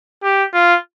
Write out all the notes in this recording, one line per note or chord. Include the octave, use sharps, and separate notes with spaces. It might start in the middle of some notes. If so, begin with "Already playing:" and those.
G4
F4